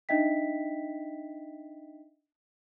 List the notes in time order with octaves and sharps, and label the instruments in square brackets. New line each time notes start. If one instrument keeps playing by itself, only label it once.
[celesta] D4 D#4 D#5 E5 G5 B6